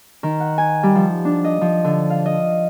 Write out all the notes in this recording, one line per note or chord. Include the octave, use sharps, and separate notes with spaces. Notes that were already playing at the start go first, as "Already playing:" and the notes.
D#3
F#5
G#5
G3
F3
D4
D#5
F3
D3
F5
D#5